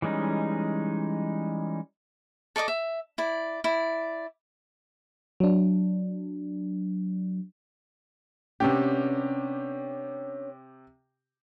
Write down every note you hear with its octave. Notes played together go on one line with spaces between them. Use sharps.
E3 G3 G#3 C#4 D#4
A4 D5 D#5 D6
E5
E4 D5
E4 D5
F#3 D4
C3 B3 C#4 D4 G4